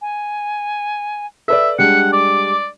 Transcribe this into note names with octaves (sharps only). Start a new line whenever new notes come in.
G#5
A4 B4 D5 E5
G3 G#3 D4 F#5 C#7
D5 D6